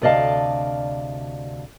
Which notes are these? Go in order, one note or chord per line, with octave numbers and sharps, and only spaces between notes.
D2 C3 D5 D#5 F5 A5